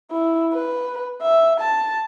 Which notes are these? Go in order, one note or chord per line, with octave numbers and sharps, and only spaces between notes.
E4
B4
E5
A5